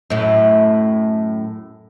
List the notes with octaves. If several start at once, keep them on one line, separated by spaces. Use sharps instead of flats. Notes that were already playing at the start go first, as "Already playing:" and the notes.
F#2 A2